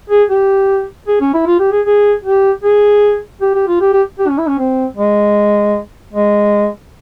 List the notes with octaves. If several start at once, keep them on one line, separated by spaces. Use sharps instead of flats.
G#4
G4
G#4
C#4
E4
F4
G4
G#4
G#4
G4
G#4
G4
G4
F4
G4
G4
G4
C#4
E4
C#4
C4
G#3
G#3